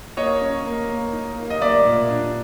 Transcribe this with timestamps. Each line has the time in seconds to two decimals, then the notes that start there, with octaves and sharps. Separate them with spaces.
0.17 A#3 C#5 D#5
0.41 C#4
0.65 A#3
0.90 A#3
1.13 D#4
1.37 A#3
1.50 D#5
1.61 A#3 D5 E5
1.85 A#2
2.10 D4